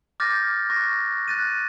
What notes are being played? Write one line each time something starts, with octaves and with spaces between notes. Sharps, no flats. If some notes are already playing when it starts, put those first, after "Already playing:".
D6 F6 G6 A6 A#6
C#6 F#6 A#6
F#6 A6 D#7